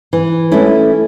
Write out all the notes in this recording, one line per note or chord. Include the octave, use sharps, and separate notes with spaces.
E3
A3 C#4 E4